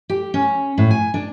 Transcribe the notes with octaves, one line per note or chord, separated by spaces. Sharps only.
G4
C#4
A2
G#5
D4